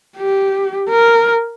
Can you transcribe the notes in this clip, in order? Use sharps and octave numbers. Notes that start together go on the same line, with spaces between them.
G4
A#4